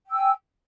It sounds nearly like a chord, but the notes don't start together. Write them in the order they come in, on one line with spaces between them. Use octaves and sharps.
G5 E6 G#5